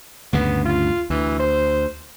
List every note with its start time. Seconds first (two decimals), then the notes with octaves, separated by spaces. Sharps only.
0.33 D2 G2 C#3 B3
0.65 F4
1.10 D2 E3
1.39 C5